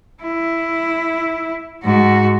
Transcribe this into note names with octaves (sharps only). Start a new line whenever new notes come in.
E4
G#2 F#4